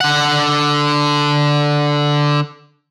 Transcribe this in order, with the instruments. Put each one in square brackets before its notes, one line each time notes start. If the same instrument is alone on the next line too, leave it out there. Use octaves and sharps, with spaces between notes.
[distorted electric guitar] D3 F#5